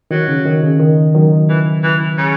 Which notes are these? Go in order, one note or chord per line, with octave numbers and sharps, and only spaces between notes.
D#3 F#3
C#3
D#3
C#3
D#3
D#3 F#3
E3
E3
C#3